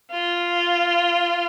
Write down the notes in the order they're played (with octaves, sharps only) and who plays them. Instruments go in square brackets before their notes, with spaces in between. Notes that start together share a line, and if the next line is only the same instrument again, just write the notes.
[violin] F4